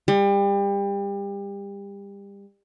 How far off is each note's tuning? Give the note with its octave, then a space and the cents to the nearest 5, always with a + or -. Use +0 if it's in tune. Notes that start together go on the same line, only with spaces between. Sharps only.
G3 +30